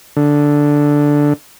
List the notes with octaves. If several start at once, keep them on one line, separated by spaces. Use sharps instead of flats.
D3